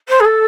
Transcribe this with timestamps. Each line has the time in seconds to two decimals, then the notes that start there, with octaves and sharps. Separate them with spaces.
0.08 C5
0.20 G#4
0.24 A4